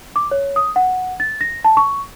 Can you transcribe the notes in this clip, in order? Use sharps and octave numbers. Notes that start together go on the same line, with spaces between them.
D6
C#5
D#6
F#5
A6
A#6
A5
C#6